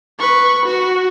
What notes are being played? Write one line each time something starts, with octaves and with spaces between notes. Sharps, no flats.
B4 C#6
F#4